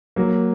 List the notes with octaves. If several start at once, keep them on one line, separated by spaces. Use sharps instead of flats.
F#3 A#3